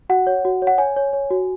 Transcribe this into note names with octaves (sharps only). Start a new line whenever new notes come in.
F#4 F#5
C#5
F#4
C#5
F#5
C#5 G#5
C#5
C#5
F#4